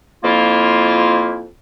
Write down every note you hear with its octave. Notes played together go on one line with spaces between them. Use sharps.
F2 A#3 E4 F4